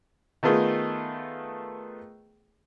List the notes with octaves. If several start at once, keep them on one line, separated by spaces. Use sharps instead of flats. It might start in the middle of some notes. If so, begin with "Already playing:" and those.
D#3 A3 B3 F4 G#4 A4